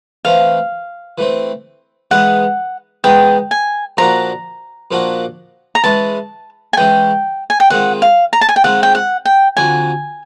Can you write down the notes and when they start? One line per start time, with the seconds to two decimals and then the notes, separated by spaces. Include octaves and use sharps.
0.25 E3 A3 C4 F5
1.18 E3 A3 C4
2.11 E3 G#3 B3 D#4 F#5
3.04 E3 G#3 B3 D#4 G5
3.51 G#5
3.97 A#2 F3 A#3 D4 F#4 A#5
4.91 A#2 F3 A#3 D4 F#4
5.75 A#5
5.84 E3 G#3 C#4 E4 A5
6.73 G#5
6.77 E3 G#3 C#4 E4 G5
7.50 G#5
7.60 G5
7.70 D#3 G#3 C4 F4 F#5
8.02 F5
8.33 A#5
8.41 A5
8.49 G#5
8.56 G5
8.64 D#3 G#3 C4 F4 F#5
8.83 G5
8.95 F#5
9.25 G5
9.57 F2 D3 F#3 G#5